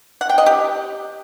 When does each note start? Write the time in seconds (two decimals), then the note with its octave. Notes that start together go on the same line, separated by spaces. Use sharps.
0.21 F#5
0.29 G5
0.38 D#5
0.46 G4